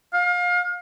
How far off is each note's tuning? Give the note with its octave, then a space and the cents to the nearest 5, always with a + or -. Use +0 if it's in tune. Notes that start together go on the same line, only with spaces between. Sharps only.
F5 +30